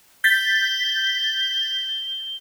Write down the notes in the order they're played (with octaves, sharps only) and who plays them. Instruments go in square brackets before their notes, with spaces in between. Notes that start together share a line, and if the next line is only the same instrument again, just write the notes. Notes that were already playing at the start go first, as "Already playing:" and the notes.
[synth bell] G6 A6 B6 [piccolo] G7